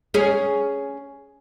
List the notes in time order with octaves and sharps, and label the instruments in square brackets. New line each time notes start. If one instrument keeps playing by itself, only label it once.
[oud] C#4 G#4